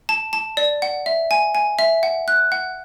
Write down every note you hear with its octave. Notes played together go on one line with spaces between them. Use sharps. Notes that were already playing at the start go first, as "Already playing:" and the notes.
A5
A5
D5
F#5
E5
G#5
G#5
E5
F#5
F#6
F#5